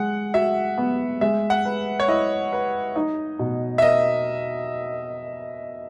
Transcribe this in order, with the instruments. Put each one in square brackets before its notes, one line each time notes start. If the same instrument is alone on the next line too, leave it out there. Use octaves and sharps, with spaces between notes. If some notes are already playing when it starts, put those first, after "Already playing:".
Already playing: [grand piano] G#3 [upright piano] F#5
[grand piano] F#4 [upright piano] E5
[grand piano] B3
[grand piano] G#3 [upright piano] E5
[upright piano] F#5
[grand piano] B4
[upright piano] C#5
[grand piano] E4 [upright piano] D#5
[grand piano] B4
D#4
B2
[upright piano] E5
[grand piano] A#4 [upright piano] D#5